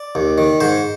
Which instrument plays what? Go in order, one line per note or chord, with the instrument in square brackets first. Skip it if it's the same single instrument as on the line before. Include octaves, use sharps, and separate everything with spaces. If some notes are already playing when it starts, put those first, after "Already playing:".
Already playing: [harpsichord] D5
D#2
D#3
G#2 C5